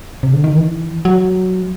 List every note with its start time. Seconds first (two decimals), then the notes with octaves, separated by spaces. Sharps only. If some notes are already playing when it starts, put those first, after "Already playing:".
0.23 C3
0.33 D3
0.44 D#3
0.54 E3
1.05 F#3